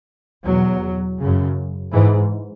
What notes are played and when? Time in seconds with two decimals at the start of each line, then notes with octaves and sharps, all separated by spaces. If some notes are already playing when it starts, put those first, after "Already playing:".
0.45 E2 B2 F#3
1.19 F#2 C#3
1.92 G#2 E3